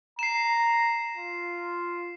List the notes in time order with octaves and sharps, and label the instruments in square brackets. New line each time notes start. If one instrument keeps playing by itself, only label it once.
[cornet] A#5 [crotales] C7 E7
[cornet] F4